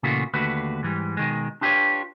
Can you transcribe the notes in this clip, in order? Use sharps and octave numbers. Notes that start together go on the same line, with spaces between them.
A#2 C#3 E3 A3 F4 F#4
D#2 D3 A3 F#4 B4
G#2 E3 G3
B2 D#3 G#3
D4 F4 G4 A4 B4 C#5